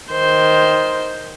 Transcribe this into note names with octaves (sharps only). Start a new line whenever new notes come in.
D#3 C5